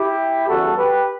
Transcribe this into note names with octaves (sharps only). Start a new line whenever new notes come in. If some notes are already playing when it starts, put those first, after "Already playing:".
Already playing: E4 G4
E2 C#3 E3 G3 F#4 A4
G4 B4